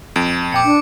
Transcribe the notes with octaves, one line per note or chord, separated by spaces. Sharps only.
F2 D7
A#2 G5 D6 C#7
D4